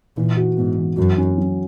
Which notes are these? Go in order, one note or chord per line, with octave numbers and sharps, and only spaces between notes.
A#2 E3
F#4
G#2 B3
E3
F#2 F#4
C#4
F#3